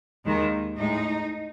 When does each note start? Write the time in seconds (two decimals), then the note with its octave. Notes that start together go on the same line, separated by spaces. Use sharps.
0.26 D#2 D#3 G#3
0.77 A2 G#3 D#4